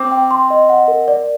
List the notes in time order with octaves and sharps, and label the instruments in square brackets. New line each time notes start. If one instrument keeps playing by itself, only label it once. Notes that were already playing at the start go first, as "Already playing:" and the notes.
Already playing: [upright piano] C4 [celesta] D6
[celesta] G5
C6
D#5
F#5
A#4
D5